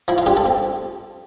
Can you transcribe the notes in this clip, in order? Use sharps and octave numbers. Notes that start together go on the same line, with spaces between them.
F3 E4
F4
G2 G4
A4
C4